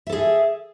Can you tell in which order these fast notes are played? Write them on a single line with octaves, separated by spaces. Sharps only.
E5 A4 G#4